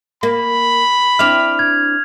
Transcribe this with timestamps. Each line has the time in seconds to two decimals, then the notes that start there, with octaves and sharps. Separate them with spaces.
0.23 A#3 B5
1.19 C4 D4 E4 F6 F7
1.59 G#6